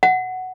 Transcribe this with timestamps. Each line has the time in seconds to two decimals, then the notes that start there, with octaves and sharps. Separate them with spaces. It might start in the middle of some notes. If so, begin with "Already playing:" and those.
0.03 F#5